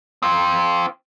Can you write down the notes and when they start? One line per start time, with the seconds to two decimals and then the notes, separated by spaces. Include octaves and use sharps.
0.22 C4 F4